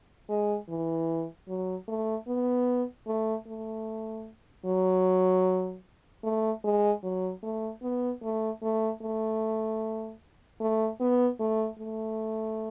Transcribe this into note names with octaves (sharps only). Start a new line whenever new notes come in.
G#3
E3
F#3
A3
B3
A3
A3
F#3
A3
G#3
F#3
A3
B3
A3
A3
A3
A3
B3
A3
A3